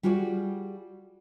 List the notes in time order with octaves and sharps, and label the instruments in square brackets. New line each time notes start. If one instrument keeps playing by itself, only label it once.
[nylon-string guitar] G3 F4 F#4 G#4 D5